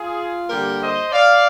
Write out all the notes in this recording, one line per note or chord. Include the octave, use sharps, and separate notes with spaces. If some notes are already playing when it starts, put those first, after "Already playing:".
Already playing: F4 G#4
D3 G3 A#3 G4 A#4
C5 D#5
D5 F5